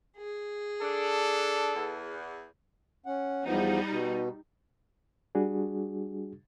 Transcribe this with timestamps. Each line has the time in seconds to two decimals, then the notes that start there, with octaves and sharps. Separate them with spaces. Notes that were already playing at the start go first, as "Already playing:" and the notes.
0.19 G#4
0.82 D4 A4
1.75 E2
3.06 C#4 F#5
3.45 E2 F3 G3 B3 D#4
3.89 B2
5.35 G3 D4 F#4 G#4